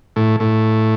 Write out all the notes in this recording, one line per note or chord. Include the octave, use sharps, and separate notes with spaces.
A2
A2